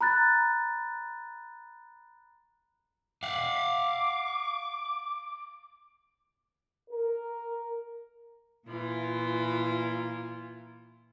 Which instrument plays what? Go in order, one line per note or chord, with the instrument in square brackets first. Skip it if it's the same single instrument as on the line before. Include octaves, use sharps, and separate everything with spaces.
[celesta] A#5 B5 F#6 A6
[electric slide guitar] F5 F#5 [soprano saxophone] D6
[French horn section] A#4
[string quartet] A#2 E3 E4 F4